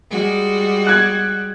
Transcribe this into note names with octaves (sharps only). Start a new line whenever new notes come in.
G3 G#3 F#4
F#6 G#6